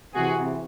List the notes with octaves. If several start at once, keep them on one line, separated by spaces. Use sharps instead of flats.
C3 E3 F#4 G#4